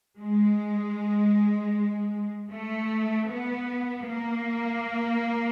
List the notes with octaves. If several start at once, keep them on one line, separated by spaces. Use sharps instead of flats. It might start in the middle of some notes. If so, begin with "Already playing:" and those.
G#3
A3
B3
A#3